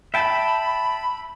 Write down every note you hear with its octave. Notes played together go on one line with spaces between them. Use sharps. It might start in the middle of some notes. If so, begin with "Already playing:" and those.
E5 G5 A5 B5